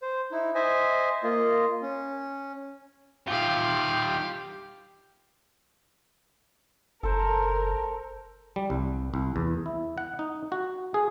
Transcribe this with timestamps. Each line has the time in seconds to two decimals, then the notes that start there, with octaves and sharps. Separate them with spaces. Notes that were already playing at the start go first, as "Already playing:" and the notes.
0.02 C5
0.31 D#4 E4
0.55 C5 D#5 E5 G#5
1.23 A#3 F4 D#5
1.82 C#4
3.28 D#3 F4 G4 F5 G5
7.03 F#1 A4 A#4 C5
8.56 G3
8.70 C2
9.14 C2
9.36 E2
9.66 E4
9.98 F#5
10.19 D#4
10.52 F#4
10.94 G#4